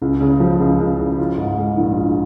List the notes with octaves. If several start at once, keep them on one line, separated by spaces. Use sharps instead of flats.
C#2
C#3
F3
C#2
C#2
C#3
F4
G#2
G#3
A#1
F4